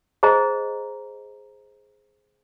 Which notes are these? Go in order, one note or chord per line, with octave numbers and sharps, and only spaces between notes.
G#4 C5 D#5 A#5